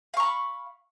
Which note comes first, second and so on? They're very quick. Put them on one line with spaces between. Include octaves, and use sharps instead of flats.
F5 C#6 A#5 B5